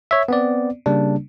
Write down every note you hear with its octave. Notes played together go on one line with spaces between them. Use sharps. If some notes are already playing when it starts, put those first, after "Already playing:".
C#5 E5
B3 C4 D5
C#3 G3 A#3 D4